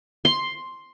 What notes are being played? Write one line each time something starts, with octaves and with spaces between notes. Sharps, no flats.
C6